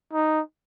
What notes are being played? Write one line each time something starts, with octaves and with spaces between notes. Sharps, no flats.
D#4